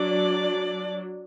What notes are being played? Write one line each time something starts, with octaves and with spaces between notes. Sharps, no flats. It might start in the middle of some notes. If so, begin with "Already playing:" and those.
Already playing: F#3 D4 D5